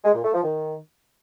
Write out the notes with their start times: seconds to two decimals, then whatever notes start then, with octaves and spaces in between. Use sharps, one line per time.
0.05 G#3
0.14 A#2
0.24 A3
0.34 F3
0.44 D#3